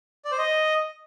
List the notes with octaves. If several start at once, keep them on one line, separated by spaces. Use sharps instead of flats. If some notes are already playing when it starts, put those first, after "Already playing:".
D5
C5
D#5